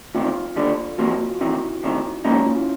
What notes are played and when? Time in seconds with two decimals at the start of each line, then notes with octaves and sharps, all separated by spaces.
0.15 D2 C3 D#3 F4
0.56 D#2 D3 G3
0.98 E2 C3 F3 A#3 F#4
1.19 F4
1.41 E2 C3 D#3 E4
1.83 D2 C3 D#3
2.25 G#2 F3 A#3 C#4 D#4
2.46 F4
2.57 E4